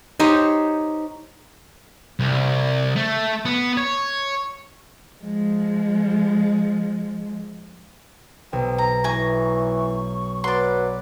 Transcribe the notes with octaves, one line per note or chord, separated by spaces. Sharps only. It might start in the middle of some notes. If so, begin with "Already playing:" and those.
D#4 G4 C5 C#5
C2
A3
B3
C#5
F3 G#3
B1 C4
A#5
E3 G#5 A#5 C#6
F#3 B4 D5 C6